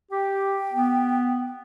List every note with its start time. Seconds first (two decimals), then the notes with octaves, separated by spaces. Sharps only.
0.12 G4 G5
0.74 B3